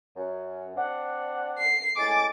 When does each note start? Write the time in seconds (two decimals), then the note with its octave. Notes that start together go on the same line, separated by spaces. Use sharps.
0.16 F#2
0.76 C4 D4 F#5
1.58 C7
1.97 A2 G#3 G#5 D6 A6